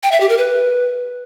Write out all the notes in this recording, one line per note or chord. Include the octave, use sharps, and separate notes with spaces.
G5
E5
G4
A#4
B4